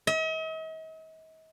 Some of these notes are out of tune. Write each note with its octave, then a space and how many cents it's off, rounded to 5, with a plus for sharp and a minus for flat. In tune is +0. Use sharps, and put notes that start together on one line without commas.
D#5 +45